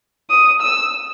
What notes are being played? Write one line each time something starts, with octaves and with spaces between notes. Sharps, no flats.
D#6
E6